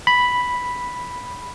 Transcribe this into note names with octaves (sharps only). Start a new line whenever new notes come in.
B5